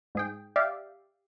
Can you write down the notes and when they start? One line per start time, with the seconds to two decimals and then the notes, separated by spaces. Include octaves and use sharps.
0.15 G#2 G#4 G5
0.56 G4 D5 E5 F5